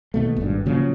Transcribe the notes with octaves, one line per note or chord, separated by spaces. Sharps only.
D#2 B2 A3
G#1 G2
A#2 C#3 F3 F#3